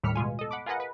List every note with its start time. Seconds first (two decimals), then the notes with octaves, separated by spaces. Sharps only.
0.03 D#2 A2 G3 F6 B6 C#7
0.15 B2 G#3 F4 G#5
0.39 A4 D#5
0.51 F#5 B5 D6
0.66 F4 G#4 A#4 B4 D#5 F#5
0.80 B4